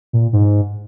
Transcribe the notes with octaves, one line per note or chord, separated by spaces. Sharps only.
A#2
G#2